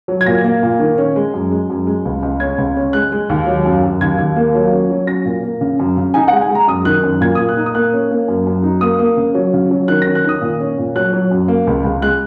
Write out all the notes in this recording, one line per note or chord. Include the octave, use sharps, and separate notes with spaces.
F#3
G#6
A#2 A#6
A#3
A#2
D#3
C#4
G#3
F#2
G#3
F#2
G#3
C#2
C#2
C#4 G#6
C#2
C#4
G#3 F#6
G#3
D#2
F#3
F#2
F#2
D#2 G#6
D#2
A#3
F#3
C#4
F#3
C#4 A#6
A#2
A#3
C#3
F#2
C#3
D#4 G#5
F#5
G#3
G#5
G#3
A#5
F#2 D#6
D#3 F#6
F#2
A#2 G#6
D#6
A#2
F#6
D#4
D#6
A#3 F#6
C#4
A#3
F#2
F#2
D#4
A#3 D#6
A#3
C#3
F#3
C#3
F#3
D#3 F#6
A#6
C#4
F#6
D#3 D#6
A#2
C#4
A#2
F#3 F#6
F#3
F#2
A#3
C#2
C#2
G#3 F#6